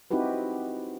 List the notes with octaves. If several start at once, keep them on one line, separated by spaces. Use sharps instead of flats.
C4 D#4 E4 F#4 G4 B4